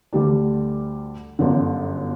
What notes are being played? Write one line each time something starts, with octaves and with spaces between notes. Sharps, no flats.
D2 D3 G3 D4
G1 F#2 D3